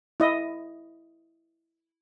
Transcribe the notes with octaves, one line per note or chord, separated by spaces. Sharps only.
E4 D#5